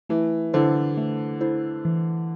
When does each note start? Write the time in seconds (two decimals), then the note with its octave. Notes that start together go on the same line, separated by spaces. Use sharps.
0.09 E3 A3
0.53 D3 E4 A4 C5
0.97 A3
1.40 E4 A4 C5
1.85 E3